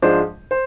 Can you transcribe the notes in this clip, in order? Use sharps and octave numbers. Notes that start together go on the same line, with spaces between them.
G#2 F3 G#3 D4 C5
C5